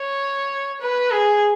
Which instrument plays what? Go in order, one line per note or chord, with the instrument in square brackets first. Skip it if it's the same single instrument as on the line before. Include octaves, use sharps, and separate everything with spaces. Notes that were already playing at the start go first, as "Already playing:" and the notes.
Already playing: [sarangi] C#5
B4
G#4